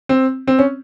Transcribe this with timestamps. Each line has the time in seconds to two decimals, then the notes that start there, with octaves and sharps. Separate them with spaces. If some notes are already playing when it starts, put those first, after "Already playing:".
0.09 C4
0.48 C4
0.59 C#4